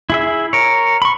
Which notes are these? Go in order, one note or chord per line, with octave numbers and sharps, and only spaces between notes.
E4 G#4 E5
A#4 C#5
B5 C#6